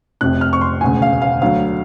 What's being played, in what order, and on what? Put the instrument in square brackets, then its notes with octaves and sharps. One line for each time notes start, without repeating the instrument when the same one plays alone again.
[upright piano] F1 F2 C3 F#6
F6
C#6
C6
E1 D2 C#3 G#5
F5
F5
D2 D3 F#3 F5